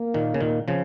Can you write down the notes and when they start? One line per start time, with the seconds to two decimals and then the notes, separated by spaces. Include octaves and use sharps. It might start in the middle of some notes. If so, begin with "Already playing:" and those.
Already playing: A#3
0.14 A#2 D#3
0.34 C#3
0.40 A#2 D#3
0.68 C#3 F3